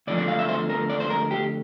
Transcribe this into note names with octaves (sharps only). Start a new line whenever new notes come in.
D2 D3 F3 D5
D5
F5
E5
C5
A#4
D5
C5
A#4
G4